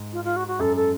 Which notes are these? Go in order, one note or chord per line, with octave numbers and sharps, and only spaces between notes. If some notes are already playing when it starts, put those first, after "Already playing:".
Already playing: G#2
F4
F4
F#4
F#4
F#2 A4
A4